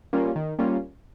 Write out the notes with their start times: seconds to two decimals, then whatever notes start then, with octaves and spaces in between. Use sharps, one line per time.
0.13 G3 A#3 C#4 F4
0.36 D#3
0.59 G3 A#3 C#4 F4